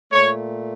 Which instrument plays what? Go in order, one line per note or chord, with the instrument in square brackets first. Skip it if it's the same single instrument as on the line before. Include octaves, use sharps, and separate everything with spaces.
[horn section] A#2 A3 C#5